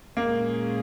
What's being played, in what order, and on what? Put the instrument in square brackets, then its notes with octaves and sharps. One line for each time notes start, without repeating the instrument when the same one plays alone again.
[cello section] A#2 G#3 C#4 G#4 [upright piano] A#3